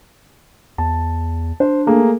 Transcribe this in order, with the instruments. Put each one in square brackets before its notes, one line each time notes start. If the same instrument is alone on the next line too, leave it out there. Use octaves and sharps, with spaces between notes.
[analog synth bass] E2 [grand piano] A5
[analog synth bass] D4 [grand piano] C5
[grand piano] A3 A#3 G#4